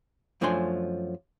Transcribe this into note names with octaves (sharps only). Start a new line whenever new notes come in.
F#2 F3 A3 D4 G#5 C6